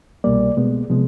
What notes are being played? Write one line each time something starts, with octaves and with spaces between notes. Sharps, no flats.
C2 B2 G3 A#3 D5
B2 G#3 B3
C3 F3 G#3 B3